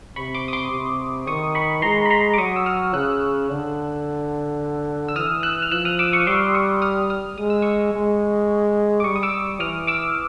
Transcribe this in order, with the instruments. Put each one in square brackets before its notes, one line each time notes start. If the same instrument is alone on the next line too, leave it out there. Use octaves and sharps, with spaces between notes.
[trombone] C3 [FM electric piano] B5 C#6
[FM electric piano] C6 D6
D#6
C6 D6
[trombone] C3
[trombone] D#3 [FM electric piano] C#6 D#6
[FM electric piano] B5 C#6
[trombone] G#3 [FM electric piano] A#5 C6
[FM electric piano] B5
A#5 C6
D6
[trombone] F#3 [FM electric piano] C#6 D#6
[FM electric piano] E6
D#6 F6
[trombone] C#3 [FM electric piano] E6 F#6
[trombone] D3
[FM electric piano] E6
[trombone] E3 [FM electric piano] D#6 F6
[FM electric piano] E6 F#6
F6
[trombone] F3 [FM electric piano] E6 F#6
[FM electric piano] D#6 F6
D6 E6
C#6 D#6
[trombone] G3 [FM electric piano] C6 D6
[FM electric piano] C#6 D#6
D#6 F6
D#6 F6
[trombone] G#3 [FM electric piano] D#6
[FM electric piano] E6
C#6 D#6
[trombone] G#3
[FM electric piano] D6
[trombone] G3 [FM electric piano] C#6 D#6
[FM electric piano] D#6
D6 E6
[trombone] E3 [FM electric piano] D#6 F6
[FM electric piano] D6 E6